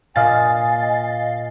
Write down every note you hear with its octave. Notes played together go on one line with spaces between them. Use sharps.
A#2 D#5 F5 G#5 A6